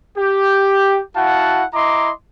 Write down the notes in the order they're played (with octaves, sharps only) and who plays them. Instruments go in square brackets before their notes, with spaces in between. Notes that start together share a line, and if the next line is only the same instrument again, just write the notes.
[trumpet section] G4
E4 F#4 F5 F#5 A5
E4 D#5 A#5 C6 D6